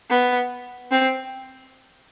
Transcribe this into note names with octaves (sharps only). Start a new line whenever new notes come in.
B3
C4